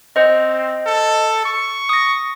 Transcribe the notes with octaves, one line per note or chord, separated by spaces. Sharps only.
C4 C5 D#5
A4
C#6
D#6 A#6